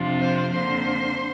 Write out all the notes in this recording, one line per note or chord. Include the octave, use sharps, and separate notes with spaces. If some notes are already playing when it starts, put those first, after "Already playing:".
Already playing: F2 C3 F3 D4 F4
C4 C5
F2 D3 F3 A#3 C5 C6